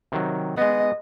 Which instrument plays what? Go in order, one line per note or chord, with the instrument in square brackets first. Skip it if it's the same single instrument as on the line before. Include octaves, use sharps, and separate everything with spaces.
[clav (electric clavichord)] C3 D#3 F#3
[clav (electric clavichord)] G#3 B3 [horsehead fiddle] D#5